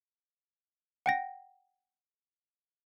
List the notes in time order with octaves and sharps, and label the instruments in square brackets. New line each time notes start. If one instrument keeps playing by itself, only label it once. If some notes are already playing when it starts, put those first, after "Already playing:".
[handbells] F#5 G5 A#6